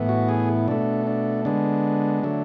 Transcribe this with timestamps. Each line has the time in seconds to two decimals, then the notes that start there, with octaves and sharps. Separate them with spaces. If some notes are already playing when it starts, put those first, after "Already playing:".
Already playing: A2 E3 B3
0.09 F#4
0.29 G#4
0.68 B2 A3 D4
1.07 D4
1.45 D3 G#3 B3 D4
2.23 D3 F#3 A3